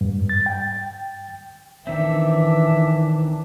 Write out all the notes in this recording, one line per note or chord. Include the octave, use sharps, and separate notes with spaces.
G2
A6
G5
D#3 E3 C4 D4 E5